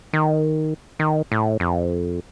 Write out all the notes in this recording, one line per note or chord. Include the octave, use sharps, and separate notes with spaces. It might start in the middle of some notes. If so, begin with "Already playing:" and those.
D#3
D#3
A2
F2